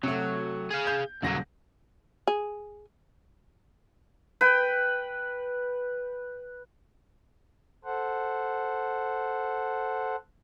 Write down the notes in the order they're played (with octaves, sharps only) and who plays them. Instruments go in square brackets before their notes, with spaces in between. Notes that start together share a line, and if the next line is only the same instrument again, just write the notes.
[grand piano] C3 A3 [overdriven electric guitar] F#3
[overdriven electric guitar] G#4 F5
[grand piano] G6
[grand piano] D#1 A#6 [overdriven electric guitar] C#2 F#3
[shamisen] G#4
[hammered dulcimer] B4 G5
[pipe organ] A4 C5 F#5